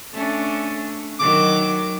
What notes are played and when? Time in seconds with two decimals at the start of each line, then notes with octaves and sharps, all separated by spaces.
0.13 A3 C#4 D4
1.20 D#3 F#3 D6